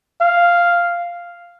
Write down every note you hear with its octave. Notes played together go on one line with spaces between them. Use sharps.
F5